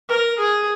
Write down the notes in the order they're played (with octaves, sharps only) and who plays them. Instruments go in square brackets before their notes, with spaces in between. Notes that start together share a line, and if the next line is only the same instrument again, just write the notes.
[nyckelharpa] A#4
G#4